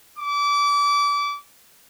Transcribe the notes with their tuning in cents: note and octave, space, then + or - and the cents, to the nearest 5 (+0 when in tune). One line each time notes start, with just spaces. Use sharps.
D6 -30